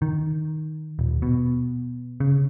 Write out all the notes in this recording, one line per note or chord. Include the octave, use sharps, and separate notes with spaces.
D#3
D#1
B2
C#3